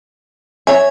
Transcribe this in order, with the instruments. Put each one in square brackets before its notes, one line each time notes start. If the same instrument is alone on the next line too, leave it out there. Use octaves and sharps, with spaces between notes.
[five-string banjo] C#5 E5 [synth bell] G#5